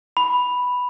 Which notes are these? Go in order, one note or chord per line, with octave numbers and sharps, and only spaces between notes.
B5